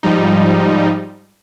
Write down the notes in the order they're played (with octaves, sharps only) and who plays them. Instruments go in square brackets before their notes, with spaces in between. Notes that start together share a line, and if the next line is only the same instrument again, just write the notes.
[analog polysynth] G#2 F3 G3 D#4